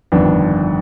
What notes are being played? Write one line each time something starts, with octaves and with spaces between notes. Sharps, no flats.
G1 F2 D#3 B3 D4